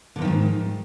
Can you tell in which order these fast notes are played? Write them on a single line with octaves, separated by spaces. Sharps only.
D3 E2 D#3 F3 G#2